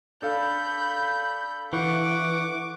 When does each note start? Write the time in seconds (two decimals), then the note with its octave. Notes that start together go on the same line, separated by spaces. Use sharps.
0.22 D4 A4 F5 B5 G6
1.73 E3 F#5 C#6 D6